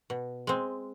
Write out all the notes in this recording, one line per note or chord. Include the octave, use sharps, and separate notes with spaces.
B2
G#3 C4